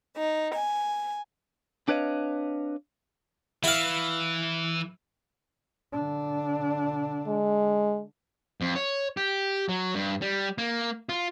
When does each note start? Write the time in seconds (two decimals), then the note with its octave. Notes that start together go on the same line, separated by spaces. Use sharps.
0.16 D#4
0.54 G#5
1.88 C4 D4 B4 C#5 D#5 F5
3.64 E3 E4 F5
5.92 D3 D4
7.27 G#3
8.61 F2
8.76 C#5
9.17 G4
9.69 F#3
9.95 G2
10.22 G3
10.58 A#3
11.09 F4